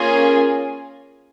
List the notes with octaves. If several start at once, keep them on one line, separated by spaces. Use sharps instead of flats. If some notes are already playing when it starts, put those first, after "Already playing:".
Already playing: A#3 C#4 F4 G#4